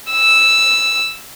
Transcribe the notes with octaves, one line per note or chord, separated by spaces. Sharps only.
E6